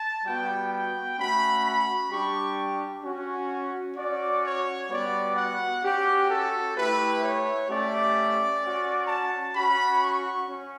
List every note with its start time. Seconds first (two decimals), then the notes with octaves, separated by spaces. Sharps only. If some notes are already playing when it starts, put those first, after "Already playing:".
Already playing: A5
0.25 G3 B3 F#4 G5
0.71 G5
1.17 A3 C#4 F#4 B5
1.64 B5
2.10 G3 D4 G4 C#6
3.03 C#4 F#4
3.97 C#4 F#4 D5
4.43 C#5
4.90 G3 B3 F#4 D5
5.36 F#5
5.83 C#4 F#4 G4
6.29 A4
6.76 A3 E4 G4 B4
7.22 C#5
7.69 A3 C#4 G4 D5
8.62 C#4 F#4
9.08 A5
9.56 C#4 F#4 B5
10.03 C#6
10.48 C#4